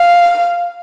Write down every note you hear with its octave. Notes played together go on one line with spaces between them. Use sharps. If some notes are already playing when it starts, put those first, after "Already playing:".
Already playing: F5